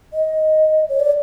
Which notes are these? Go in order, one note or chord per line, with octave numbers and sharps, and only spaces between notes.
D#5
C#5
D5